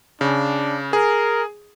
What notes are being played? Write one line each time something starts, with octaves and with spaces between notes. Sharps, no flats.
C#3 D4
G#4 A#4